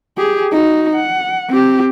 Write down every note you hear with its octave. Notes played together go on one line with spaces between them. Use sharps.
G4 G#4
D#4 F#4
F#5
C4 G4